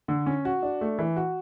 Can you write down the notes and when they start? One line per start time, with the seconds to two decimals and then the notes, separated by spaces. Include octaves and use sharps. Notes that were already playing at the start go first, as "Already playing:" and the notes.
0.08 D3
0.26 C#4
0.45 F#4
0.63 D4
0.81 A3
0.99 E3
1.16 F#4